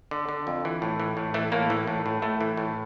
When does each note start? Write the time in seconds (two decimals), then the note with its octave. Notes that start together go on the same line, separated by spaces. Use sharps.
0.11 D3
0.29 D3
0.47 F2
0.65 E3
0.82 A2
1.00 E3
1.17 A2
1.34 E3 A3
1.52 A2 A#3
1.70 E3
1.87 A2
2.06 A2
2.22 A2 A3
2.41 E3
2.57 A2